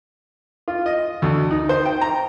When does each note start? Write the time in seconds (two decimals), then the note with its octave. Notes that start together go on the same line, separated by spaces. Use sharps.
0.68 F4
0.86 D#5
1.22 D2
1.51 D#4
1.69 C5
1.85 G5
2.01 A#5